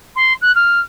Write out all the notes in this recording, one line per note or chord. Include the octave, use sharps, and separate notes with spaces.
C6
F#6
F6